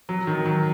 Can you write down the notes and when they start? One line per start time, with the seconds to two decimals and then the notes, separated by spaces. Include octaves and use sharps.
0.09 F#3
0.27 D#3
0.46 F#3